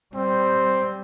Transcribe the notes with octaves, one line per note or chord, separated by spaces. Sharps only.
G3 C4